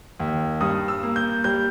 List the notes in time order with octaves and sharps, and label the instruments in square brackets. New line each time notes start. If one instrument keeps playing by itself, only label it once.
[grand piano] D#2
G2 D#6
E6
A#3
G6
G3 G6